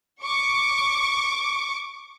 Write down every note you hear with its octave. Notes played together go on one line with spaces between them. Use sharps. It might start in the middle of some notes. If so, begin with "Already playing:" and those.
C#6 D6